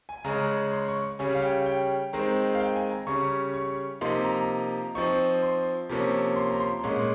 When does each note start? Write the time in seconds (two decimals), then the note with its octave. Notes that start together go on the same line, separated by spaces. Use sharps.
0.09 G#5
0.25 C#3 G#3 C#4 A#5
0.72 C6
0.88 C#6
1.19 C#3 G3 C#4 G#5
1.35 F5
1.42 G5
1.66 G5
2.13 D#3 G#3 C4 A#5
2.36 A#5
2.55 F5
2.60 G5
2.76 G#5
2.91 A#5
3.07 C#3 G3 C#4 C#6
3.54 C#6
4.01 C3 F3 A#3 D#4 C6
4.25 A#5
4.95 F3 C4 D#4 C#6
5.42 C6
5.89 C3 F3 A#3 C#4
6.36 C6
6.51 A#5
6.60 C6
6.84 A#2 G#3 C#4